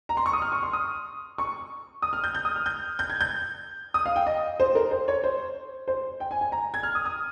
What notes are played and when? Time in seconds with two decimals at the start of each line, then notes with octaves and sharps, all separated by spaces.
0.09 A#5
0.17 C6
0.26 C#6
0.33 D#6
0.42 F6
0.52 C#6
0.63 C6
0.73 D#6
1.38 C#6
2.02 D#6
2.13 F6
2.24 G6
2.35 G6
2.45 D#6
2.56 F6
2.66 G6
2.99 G6
3.10 G#6
3.21 G6
3.94 D#6
4.06 F5
4.16 G5
4.27 D#5
4.60 C5
4.75 A#4
4.91 C5
5.08 C#5
5.24 C5
5.88 C5
6.20 G5
6.31 G#5
6.41 G#5
6.52 A#5
6.74 G#6
6.83 F6
6.95 D#6
7.05 D#6